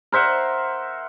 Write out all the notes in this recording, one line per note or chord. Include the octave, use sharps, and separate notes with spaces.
A#4 C5 E5 F#5